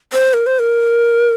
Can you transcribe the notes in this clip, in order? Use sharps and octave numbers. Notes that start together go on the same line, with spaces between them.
C5
A#4
C5
A#4